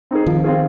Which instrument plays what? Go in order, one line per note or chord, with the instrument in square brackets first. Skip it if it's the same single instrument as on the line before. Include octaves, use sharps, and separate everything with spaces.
[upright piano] C4 D#4 G#4
[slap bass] D#3 [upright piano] F3
[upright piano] C4 F4 G#4